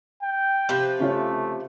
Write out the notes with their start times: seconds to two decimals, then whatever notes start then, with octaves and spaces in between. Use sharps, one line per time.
0.22 G5
0.69 C3 F3 B4 G6
1.00 C#3 A3 F4 C#5